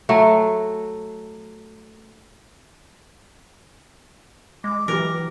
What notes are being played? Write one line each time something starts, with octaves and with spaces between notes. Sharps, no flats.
F#3 A3
G#3 D6
E3 F#3 G4 A#4